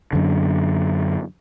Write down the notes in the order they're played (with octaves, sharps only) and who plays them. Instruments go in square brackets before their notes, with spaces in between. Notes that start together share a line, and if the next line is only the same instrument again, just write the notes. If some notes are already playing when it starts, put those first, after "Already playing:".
[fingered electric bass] F#2 D3